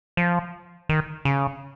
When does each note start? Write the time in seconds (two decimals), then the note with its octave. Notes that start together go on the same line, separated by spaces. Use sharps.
0.17 F3
0.89 D#3
1.25 C#3